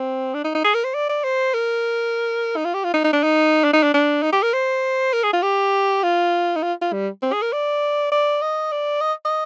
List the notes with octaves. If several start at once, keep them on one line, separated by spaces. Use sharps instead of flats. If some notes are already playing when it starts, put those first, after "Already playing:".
Already playing: C4
D4
D#4
D#4
G#4
A#4
C5
D5
D5
C5
A#4
D#4
F4
G4
F4
D#4
D#4
D4
D#4
D4
D#4
D4
D4
D#4
G4
A#4
C5
A#4
G#4
F4
G4
F4
D#4
F4
F4
G3
C4
G#4
A#4
D5
D5
D#5
D5
D#5
D#5